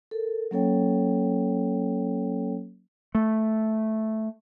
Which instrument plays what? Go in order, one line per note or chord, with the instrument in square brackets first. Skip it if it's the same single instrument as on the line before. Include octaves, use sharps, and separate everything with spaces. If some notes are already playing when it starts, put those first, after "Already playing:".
[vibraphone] A4 A#4
F#3 A#3 C#4 A4 C#5 G5
[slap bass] A3